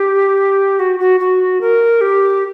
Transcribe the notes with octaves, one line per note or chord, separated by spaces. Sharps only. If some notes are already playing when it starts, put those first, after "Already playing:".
Already playing: G4
F#4
F#4
F#4
A#4
G4